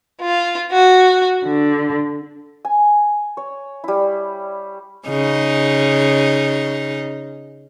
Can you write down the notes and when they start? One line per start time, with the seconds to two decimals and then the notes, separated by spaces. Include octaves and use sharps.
0.22 F4
0.72 F#4
1.45 D3
2.65 G#5
3.37 C#5
3.84 G3 E4
5.08 C#3 D#4